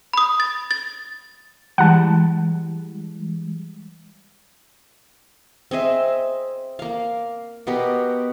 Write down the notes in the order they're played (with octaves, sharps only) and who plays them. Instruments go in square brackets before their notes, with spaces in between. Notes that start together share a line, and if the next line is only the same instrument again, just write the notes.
[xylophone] B5 D#6
A6
A6
[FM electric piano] E3 G3 G#3 [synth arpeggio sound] F#5 A5
[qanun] C4 G#4 D#5 E5
A#3 F5
B2 B3 G4 A#4